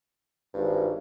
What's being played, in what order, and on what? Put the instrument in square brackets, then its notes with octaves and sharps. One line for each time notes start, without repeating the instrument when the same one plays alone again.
[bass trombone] G#1 [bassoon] G2